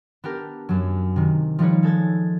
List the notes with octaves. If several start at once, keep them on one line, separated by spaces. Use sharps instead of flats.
B3 D4 G4 A#4
F#2 F#3
C3 D#3
F3 G3 D#4 B4 C#5
G#3 A4 G#6 A6